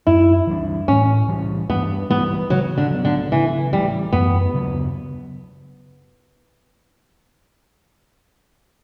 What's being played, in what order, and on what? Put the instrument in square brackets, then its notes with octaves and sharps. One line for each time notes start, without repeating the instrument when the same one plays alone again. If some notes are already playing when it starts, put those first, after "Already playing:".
[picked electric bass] F#2 [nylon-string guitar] E4
[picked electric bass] E3 G3 D4
[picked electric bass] A2 [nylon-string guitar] C#4
[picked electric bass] E3 G3
[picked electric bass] G2 [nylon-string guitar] B3
[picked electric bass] E3 G3 [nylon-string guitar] B3
[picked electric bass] C#3 [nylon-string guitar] F#3
[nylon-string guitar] D3
[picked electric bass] F#3 B3
[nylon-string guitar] D3
[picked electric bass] C#3 [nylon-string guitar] E3
[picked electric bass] E3 A3 [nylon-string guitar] G3
[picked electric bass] F#2 [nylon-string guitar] B3
[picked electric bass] C#3 F#3 B3